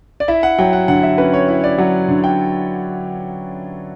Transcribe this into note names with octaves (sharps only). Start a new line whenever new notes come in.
D5
E4 E5
F#5
F#3 G5
F#5
D3 F#5
E5
C#4 B4
C#5
E4
D5
F#3 F#5
D3
G5